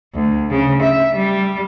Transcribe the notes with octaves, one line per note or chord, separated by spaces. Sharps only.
D2
C#3
E5
G3